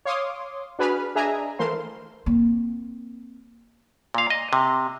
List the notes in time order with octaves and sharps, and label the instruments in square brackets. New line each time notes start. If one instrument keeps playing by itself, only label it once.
[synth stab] C#5 F5 C6 D6 D#6
D4 F#4 G#4 B4 B5 F6
D4 G#4 D#5 E5 G#5 A#5
E3 A3 A#4 C5 F5 C6
[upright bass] A#3 C4
[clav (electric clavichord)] A#2 F5
D#5
C3